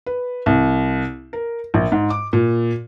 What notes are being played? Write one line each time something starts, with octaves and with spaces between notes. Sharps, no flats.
B4
C2
A#4
A#1
G#2
D6
A#2